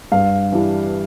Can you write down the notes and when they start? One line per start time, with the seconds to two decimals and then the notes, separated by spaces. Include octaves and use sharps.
0.12 G2 F5
0.52 E3 G3 D4